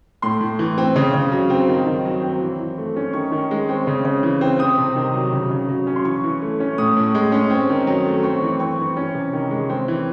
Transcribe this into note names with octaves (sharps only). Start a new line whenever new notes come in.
A2 C6
A2
E3
C4
C#3
C#3
F#3
C4
D#3
D#3
F#3
C4
E3
E3
A3
C#4
D#3 C#6
D#3
G#3
C4
C#3
C#3
E3
C4
C4 D#6
C3
D#3
F#3
C#3
C#3
F#3
C#4
C6
E3 C#6
E3
A3
C#4
A2 D#6
A2
G#3
C#4
C4
D#3
F#3
A3
C4 C#6
E3
C4 C#6
E3
C#4
C3
D#3
G#3
C4
E3